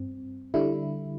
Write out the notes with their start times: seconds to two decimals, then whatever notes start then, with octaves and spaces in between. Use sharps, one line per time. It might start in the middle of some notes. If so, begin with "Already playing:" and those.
Already playing: G2 C4
0.54 D3 G3 E4